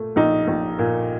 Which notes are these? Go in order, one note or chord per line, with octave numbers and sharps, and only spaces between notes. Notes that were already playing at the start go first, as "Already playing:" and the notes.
Already playing: A#2 A3
A#1 D#4
A#1
A#2